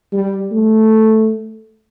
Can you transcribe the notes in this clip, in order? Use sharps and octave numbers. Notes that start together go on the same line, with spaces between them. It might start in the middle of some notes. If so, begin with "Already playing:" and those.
G3
A3